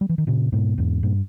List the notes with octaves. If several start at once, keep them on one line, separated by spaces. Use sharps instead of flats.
G3
E3
D#3
A#2 C#3
G#2 B2
E2 G#2
G2 A#2